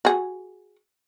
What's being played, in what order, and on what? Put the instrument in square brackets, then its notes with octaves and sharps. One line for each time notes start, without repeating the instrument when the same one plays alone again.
[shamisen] F#4 G#4